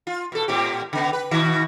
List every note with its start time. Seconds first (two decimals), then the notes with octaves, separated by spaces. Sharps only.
0.07 F4
0.32 B2 A4
0.48 A2 C4 G4
0.93 C#3 B3
1.13 B4
1.31 B2 D#3 F#4